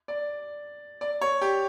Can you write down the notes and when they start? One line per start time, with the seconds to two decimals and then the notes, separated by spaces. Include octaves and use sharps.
0.08 D5
1.01 D5
1.21 C#5
1.41 G4